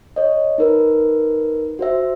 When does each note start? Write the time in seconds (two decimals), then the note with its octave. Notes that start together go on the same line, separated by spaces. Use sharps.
0.16 C#5 D#5
0.58 D#4 A#4 B4
1.79 F#4 C5 E5